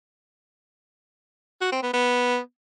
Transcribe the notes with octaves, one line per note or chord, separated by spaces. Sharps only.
F#4
C4
B3
B3